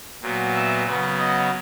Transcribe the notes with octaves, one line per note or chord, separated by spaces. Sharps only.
A#2 F#3 B3
E5
C#3 F#3 B3
D#5